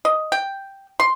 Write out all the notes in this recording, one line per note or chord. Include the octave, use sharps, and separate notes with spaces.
D#5
G5
C6